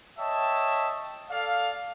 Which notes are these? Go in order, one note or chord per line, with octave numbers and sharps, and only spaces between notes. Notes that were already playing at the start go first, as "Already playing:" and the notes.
C#5 D#5 E5 G5 A5
A4 D5 F5